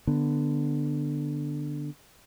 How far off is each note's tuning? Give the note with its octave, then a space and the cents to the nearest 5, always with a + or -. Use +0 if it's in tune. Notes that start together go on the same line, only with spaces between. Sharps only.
D3 +10 B3 +0